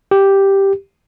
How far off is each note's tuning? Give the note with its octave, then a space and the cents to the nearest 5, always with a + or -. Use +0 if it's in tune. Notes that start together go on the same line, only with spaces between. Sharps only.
G4 +0